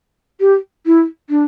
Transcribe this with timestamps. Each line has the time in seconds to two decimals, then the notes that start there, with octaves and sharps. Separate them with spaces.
0.40 G4
0.86 E4
1.30 D4